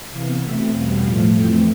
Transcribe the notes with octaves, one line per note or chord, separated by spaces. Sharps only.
C3 E3 B3 F5
B2 A3 C4 E5
E2 B2 G3 B3 F5
A2 F3 A3 F5
F2 E3 A3 C4 G5